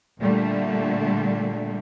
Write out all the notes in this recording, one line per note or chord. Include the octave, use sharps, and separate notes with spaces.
A#2 D3 G3 A3